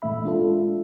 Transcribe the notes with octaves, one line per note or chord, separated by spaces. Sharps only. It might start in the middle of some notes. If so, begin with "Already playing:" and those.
A#2 E3 A3 E5 B5
G#3 D4 F4 A4